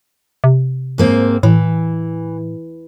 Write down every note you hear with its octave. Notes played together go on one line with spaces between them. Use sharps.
C3
G#2 A#3 C4
A2 E3